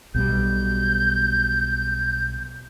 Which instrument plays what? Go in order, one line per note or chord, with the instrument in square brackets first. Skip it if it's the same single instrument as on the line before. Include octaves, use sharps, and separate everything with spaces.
[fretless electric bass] B1 B2 G3 [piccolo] G6